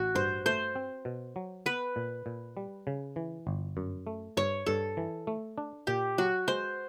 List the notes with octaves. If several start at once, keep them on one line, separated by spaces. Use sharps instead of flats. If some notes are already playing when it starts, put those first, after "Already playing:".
Already playing: A1 F#4
G2 C5
A3 C5
C4
B2
F#3
B3 B4
A#2
A#2
G3
C#3
E3
G1
F#2
A3
G2 C#5
G2 A4
E3
A3
D4
A#2 G4
F#3 F#4
G#3 C5